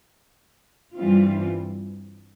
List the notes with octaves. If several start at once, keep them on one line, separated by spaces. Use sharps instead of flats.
G2 E3 G3 C4 F4